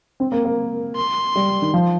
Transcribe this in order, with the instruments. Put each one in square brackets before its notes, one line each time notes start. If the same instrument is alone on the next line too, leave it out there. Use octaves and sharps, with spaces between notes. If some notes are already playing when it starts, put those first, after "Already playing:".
[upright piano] C4
A#3
A#3
[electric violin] C6
[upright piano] G3
D#3
F3